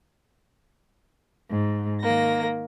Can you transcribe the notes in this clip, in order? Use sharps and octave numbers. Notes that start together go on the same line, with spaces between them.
G#2
D#3 A#3 A#6